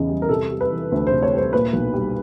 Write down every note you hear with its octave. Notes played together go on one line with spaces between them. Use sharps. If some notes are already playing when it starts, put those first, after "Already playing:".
Already playing: E2 C#3 E3 D#4
G3
A#4
C3 A4
G3
B4
E3
D2
C3 C5
C#5
G3 C5
A#2 B4
B1
G3